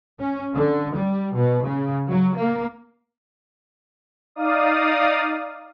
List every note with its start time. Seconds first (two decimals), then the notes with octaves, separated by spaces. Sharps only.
0.20 C#4
0.54 D3
0.95 G3
1.34 B2
1.65 C#3
2.08 F#3
2.37 A#3
4.35 D#4 D5 F5 D#6